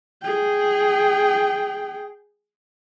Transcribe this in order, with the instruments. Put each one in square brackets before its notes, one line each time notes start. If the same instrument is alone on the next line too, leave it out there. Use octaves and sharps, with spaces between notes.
[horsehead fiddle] G#4 G5